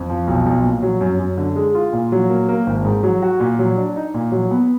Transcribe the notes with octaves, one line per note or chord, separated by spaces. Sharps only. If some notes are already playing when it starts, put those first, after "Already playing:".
Already playing: F2
F3
B1
B1
A#2
F#3
F#2
F#2
D3
G#3
F4
A#2
F#3
A#3
A#3
G#1
G#2
F#3
F#4
A#2
F#3
D4
D#4
A#2
F#3
B3